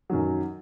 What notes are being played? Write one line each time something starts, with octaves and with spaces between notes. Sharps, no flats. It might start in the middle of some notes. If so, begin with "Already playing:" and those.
F#2 D#3 F#3